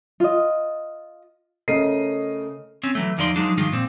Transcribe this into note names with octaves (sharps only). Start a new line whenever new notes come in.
F4 D#5
C#3 A3 A#4 D#5 C7 D#7
C4 C#4
E3 F#3 A3
E2 F3 D#4 D5 C6
F3 F#3 G#3 D4 D#4
G2 D#3 F3 G#3 F4
A#2 C4